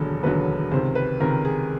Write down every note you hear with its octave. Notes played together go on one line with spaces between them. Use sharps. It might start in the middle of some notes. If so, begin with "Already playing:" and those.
Already playing: E1 D#2 D3 F#3 A4
E1 D#2 D3 F#3 B4
C#2 C3 D#3 C5
B4
C#2 C3 D#3 A#4
G#4